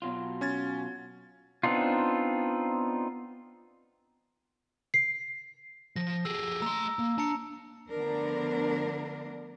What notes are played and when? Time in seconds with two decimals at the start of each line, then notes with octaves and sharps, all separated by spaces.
0.02 B2 F#3 F4
0.41 C#4 G#6 A6
1.63 B3 C4 D4 D#4 F4
4.94 C7
5.96 F3 A#6
6.25 G4 G#4 E6
6.62 A3 A#5 C6 E6
6.99 A#3
7.18 D4 A5 A#5 C#7
7.91 D3 F3 A3 B3 D4 A#4